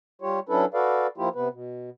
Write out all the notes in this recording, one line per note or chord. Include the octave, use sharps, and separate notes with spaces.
G3 F4 G4 C#5
F#3 C#4 D4 E4 A4 B4
F#4 A4 B4 D5 F5
F3 A#3 E4 F4 G4
C3 B3 B4
B2